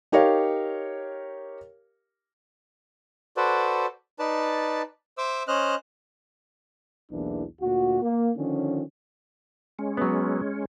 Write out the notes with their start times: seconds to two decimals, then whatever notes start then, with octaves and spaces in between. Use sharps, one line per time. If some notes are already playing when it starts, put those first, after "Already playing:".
0.12 D#4 G4 A#4 C#5 F5
3.37 F#4 A4 B4 C5 D5
4.19 D#4 B4 D5 A5
5.18 C5 E5 D6 E6
5.48 C#4 C5 D#5 F6 F#6
7.11 B1 E2 E3 A#3 D4
7.61 D2 A#2 F#4
8.02 A#3
8.37 D3 D#3 F3 C#4
9.79 G#3 C#4
9.97 F#3 B3